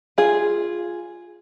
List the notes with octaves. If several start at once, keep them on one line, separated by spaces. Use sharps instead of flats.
F4 G#4